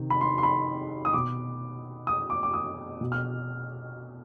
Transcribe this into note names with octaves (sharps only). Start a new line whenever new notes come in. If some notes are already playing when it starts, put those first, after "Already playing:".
Already playing: C3 D#3
B5
C6
C6
B5
D#6
B2 D6
D#6
D6
D6
D#6
B2
F6